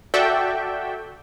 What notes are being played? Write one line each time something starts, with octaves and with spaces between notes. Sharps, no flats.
F#4 A4 D5 E5 G5